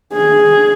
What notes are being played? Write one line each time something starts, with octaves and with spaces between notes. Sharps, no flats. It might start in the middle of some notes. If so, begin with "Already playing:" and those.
G#4